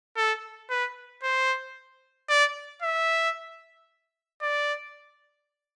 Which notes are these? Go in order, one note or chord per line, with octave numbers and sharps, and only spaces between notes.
A4
B4
C5
D5
E5
D5